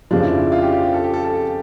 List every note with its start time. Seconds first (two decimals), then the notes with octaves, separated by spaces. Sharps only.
0.11 F2 C#3 F3 D4
0.24 E4
0.38 E4
0.52 F4
0.62 G4
0.72 G4
0.83 G4
0.94 A4
1.04 G4
1.13 A4
1.24 A4
1.35 G4